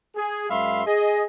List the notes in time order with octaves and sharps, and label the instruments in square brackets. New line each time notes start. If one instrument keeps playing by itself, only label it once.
[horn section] G#4
F#2 G#3 E5 F5 B5 C6
G#4 D#5